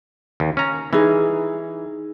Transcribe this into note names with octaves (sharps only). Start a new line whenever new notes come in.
D#2
C#4 A#5
E3 D#4 G#4